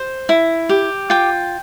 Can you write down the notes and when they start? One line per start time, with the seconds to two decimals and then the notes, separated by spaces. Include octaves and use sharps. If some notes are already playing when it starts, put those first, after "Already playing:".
Already playing: C5
0.29 E4
0.69 G4
1.10 F4 G5